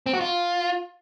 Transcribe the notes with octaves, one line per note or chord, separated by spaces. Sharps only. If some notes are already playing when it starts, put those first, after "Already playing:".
C4
F#4
F4